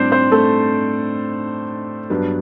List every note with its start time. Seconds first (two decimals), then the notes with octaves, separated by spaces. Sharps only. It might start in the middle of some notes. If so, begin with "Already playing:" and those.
Already playing: A2 G3 C4 D4 C5 D5
0.12 C4 C5
0.31 A3 A4
2.10 G2 F#3 B3 D4